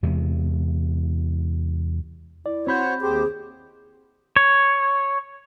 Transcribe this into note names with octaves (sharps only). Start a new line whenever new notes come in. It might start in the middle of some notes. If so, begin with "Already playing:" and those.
E2 C3 G#3
E4 D5
C4 F#4 C5 C#5 B5 G6
D#2 G4 G#4 C5
C#5